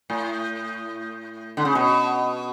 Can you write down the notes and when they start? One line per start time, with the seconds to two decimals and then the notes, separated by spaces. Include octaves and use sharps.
0.10 A2
1.57 D3
1.65 C#3
1.75 B2